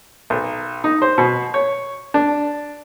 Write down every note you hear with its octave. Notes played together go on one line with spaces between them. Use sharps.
B1
D#4
C5
B2
C#5
D4